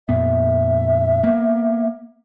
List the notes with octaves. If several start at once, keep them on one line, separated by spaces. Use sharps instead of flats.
F2 A#2 B3 E5
A#3 B3